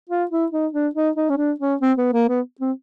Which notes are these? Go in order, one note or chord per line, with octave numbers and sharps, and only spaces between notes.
F4
E4
D#4
D4
D#4
D#4
C#4
D4
C#4
C4
B3
A#3
B3
C4